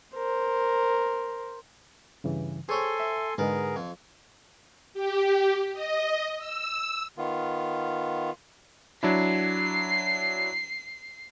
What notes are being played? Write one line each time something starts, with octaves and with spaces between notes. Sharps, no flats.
A#4 C5
G2 C#3 E3
G#4 A4 C5 C#5 G5 G#5 C6
E5
G#2 D3 G#3 B3 G#4 A#4
F2
G4
D#5
E6
D#3 B3 F4
F#3 D4 E4 C7